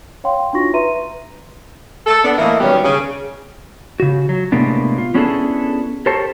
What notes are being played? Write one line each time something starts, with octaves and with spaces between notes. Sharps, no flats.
C#5 F5 G5 C6
D4 D#4 F4 F#4 C#6 A#6
B4 E5 A#5 C6 D#7
A4
B3 D4
A2 E3 A#3 E4 A#4 D#5
B2 D#3 F#3 G3 B3 C#4
C#3
C#3 F#4
F#3
A2 C3 G#3 A#3 B3 D4
F4
B3 C#4 D4 E4 G#4 A4
G4 A4 A#4 C5 C#5 A5